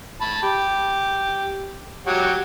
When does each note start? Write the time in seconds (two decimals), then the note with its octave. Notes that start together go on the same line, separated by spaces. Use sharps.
0.21 A5 B5
0.43 G4
2.07 F#3 F#4 G4